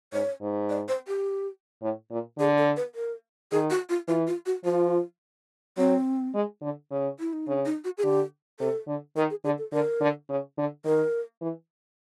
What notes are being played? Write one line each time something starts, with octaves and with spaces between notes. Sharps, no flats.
G#2 C#5
G#2
D5
C5
G4
A2
A#2
D3 G#4
A4
B4
A#4
D#3 G#4
F#4
F4
E3 F4
F4
F#4
F3 F4
F#3 C4
G#3
D3
C#3
E4
D#4
C#3 D4
D#4
F#4
G#4
D3 G4
C3 A4
D3
D#3 A#4
G#4
D3 G#4
A4
D3 A#4
D3
C#3
D3
D#3 A#4
E3